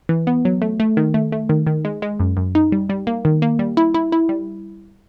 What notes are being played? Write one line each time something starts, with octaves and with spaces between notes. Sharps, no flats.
E3
B3
F#3
A3
A3
D#3
A3
A3
D#3
D#3
G#3
G#3
F#2
F#2
D#4
G3
G3
A#3
D#3
A#3
G3
E4
E4
E4
G3